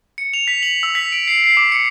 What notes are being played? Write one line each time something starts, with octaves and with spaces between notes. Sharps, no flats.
C#7
F7
B6
F#7
E6
B6
D7
C7
C7
D6
C#7